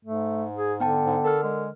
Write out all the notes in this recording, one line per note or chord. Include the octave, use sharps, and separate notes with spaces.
G#2 A3
G#4
D3 B3 G5 A5
G#2
A4 A#4 F6
G#3